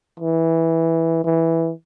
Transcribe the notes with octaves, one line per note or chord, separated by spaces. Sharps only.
E3
E3